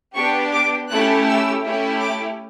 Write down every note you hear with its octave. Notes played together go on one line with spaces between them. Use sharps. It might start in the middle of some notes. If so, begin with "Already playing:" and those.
B3 D4 G4 C#6
D6
A3 C#4 E4 G4 F#6
E6
A3 C#4 E4 G4
D6